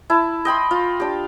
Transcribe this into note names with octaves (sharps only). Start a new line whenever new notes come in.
E4 A5
D#5 G5 B5 C6
F4
D4 G4